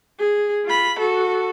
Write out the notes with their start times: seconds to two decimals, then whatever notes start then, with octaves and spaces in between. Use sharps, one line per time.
0.19 G#4
0.66 F4 B5
0.99 F#4 A4